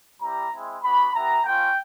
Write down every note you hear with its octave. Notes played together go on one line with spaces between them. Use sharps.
G3 C4 E4 G4 A#5
G#3 C4 E4
B3 D4 F#4 B5
B3 E4 G4 A#5
A#3 C#4 F4 G5